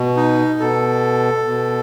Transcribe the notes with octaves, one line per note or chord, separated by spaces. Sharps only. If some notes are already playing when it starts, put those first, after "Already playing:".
Already playing: B2
D#4
B2 A4
B2